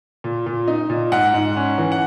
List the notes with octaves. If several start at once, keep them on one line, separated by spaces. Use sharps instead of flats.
A#2
A#2
D#4
A#2
G#2 F#5
G#2
C#4
E3
F#5